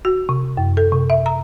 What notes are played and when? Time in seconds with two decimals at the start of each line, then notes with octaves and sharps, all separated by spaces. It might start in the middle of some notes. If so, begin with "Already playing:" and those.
0.05 F#4
0.29 C3
0.57 F#2
0.77 A4
0.92 C3
1.10 E5
1.26 A#5